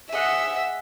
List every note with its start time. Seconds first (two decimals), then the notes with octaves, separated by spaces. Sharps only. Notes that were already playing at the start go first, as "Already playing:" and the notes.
0.11 G#4 D#5 E5 F#5